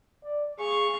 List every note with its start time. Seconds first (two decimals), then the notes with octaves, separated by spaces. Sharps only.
0.24 D5
0.59 G#4 F5 C#6